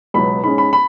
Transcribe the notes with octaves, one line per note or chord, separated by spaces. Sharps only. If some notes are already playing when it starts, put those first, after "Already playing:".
C#2 B2 F#3 B3 B5
G#2 G#3 C#4 B5
B5
B5